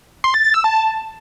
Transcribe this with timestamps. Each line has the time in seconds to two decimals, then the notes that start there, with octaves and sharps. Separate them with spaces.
0.24 C6
0.34 A6
0.44 A6
0.54 E6
0.64 A5